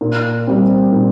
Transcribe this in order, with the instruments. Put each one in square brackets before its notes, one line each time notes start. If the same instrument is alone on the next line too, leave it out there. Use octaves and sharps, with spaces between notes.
[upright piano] A#2
G3 C4
A#2